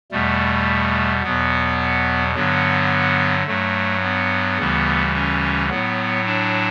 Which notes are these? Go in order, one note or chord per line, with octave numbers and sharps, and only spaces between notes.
E2 B2 G3 A3
E2 B2 F#3 B3
G2 D3 F#3 B3
G2 F#3 A3
B3
D2 C#3 E3 G3
C#4
A2 F#3 B3
D4